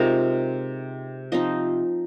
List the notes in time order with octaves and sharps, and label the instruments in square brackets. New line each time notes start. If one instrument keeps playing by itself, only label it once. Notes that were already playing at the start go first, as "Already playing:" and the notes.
Already playing: [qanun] C3 G#3 D#4 F4 A#4
F3 C4 D#4 D#5